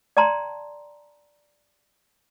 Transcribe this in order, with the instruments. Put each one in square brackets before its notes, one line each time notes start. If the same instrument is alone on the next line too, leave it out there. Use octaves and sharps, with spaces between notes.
[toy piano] D5 G5 A5 A#5 C6